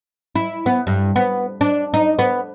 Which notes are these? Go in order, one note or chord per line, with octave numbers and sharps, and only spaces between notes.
E4
B3
G2
B3
D4
D#4
B3